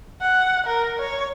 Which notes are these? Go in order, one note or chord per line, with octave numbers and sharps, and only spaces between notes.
F#5
A#4
C#5